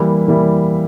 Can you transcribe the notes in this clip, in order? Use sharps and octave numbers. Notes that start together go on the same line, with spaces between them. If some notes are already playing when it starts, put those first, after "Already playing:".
Already playing: E3 G3 A#3 E4 G4
E3 G3 A#3 E4 G4